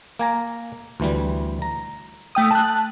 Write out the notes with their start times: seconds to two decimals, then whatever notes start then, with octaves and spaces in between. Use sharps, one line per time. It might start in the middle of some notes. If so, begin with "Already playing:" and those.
0.19 A#3 G#5 A#5
1.00 D2 E3 G3
1.62 A#5
2.35 A3 G5 D#6
2.51 A5 F#6